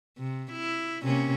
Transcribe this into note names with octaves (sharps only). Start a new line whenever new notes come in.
C3
E4
C3 A#3 C#4